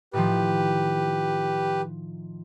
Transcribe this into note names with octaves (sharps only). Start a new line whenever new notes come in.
A2 D#3 F3 G4 B4